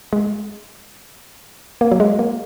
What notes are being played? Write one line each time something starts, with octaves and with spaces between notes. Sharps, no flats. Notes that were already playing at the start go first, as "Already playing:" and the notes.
G#3
A#3
F#3
G#3
A#3